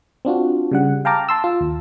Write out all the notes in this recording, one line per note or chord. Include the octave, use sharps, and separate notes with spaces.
C4 D4 F4 F#4
C#3 G3 F#5
F5 G5 A5 A#5 D6 F6
A5 C6 E6
F4
D#2